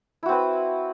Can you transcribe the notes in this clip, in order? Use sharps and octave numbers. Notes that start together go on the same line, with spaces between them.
C4 E4 F#4 B4